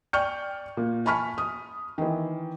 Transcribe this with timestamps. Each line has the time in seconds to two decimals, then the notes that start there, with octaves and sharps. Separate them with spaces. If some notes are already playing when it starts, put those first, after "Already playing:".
0.13 D5 G5 C#6 F6 G6 C#7
0.77 A#2
1.06 G#5 A5 B5 C#6 F6 B6
1.38 D#6
1.98 D#3 E3